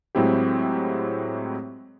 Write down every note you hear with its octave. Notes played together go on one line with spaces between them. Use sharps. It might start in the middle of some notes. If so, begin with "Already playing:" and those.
A2 F#3 G#3 C4 E4 G4